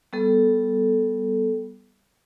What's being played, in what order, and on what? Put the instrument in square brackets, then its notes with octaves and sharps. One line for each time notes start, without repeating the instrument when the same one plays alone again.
[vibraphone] G3 B3 A4